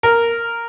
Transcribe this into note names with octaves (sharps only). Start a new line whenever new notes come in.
A#4